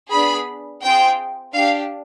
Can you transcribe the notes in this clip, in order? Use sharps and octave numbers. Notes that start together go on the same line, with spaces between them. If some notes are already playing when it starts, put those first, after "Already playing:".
B3 D4 G#4 B5
C4 F4 G#4 G5
D4 G4 F5